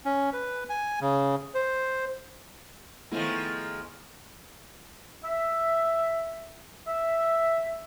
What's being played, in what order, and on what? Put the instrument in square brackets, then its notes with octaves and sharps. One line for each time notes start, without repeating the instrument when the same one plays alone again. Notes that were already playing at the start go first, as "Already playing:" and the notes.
[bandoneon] C#4
B4
G#5
C#3
C5
[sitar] D#3 F3 G#3 [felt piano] A3 B3 E4
[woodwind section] E5
E5